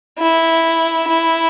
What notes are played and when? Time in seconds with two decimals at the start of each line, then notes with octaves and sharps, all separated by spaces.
0.18 E4
1.08 E4